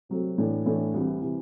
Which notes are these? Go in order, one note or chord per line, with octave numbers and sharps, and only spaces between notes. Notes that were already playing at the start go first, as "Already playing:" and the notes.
C3 F#3 A3 C4
A2 E3 A3 D4
A2 E3 A3 D4
C2 C3 E3
C3 E3